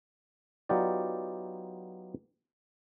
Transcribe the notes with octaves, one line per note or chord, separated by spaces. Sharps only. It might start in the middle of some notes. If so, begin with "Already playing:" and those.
F#3 B3 D#4 F4 G4 D5